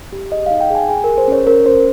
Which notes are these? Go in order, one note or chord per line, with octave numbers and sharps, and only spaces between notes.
G4
G#4 D#5
D#4 F5
G5
G#4 G#5
G#4 G#5
G#4 A#4
C5
C#4 C#5
C#4 A#4
C#4 C5